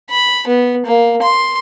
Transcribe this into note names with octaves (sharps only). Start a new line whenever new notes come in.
B5
B3
A#3
C6